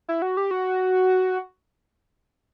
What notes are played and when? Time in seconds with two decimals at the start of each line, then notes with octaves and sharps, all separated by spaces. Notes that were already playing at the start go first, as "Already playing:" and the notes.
0.09 E4
0.22 F#4
0.37 G4
0.51 F#4